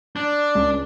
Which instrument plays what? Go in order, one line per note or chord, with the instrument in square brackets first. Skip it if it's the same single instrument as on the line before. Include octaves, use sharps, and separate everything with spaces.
[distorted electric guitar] D4
[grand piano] C#2